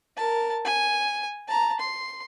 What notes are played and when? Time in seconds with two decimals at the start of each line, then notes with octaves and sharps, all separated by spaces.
0.16 A#4 A5
0.64 G#5
1.48 A5 A#5
1.80 C6